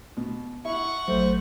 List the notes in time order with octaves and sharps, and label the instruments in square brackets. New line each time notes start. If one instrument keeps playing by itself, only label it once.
[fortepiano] B2
[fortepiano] E4 [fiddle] F#5 C#6
[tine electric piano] A1 F#3 [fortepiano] A3 [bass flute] C5